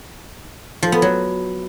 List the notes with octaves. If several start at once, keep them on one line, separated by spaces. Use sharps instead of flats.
F3
B3
F#3